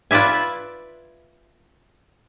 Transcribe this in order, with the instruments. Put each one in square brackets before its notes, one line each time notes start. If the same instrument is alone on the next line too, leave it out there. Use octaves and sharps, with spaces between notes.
[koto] F4 B4 D5 E5 G#5